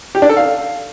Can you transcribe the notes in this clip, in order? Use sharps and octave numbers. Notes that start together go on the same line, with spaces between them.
G4
D4
A4
F5